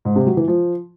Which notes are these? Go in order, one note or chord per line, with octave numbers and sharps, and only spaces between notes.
G#2
C3
F#3
E3
F3